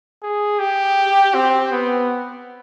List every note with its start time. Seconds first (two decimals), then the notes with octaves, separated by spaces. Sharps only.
0.23 G#4
0.59 G4
1.35 C4
1.72 B3